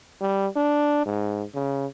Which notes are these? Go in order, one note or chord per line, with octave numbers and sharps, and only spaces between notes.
G3
D4
G#2
C#3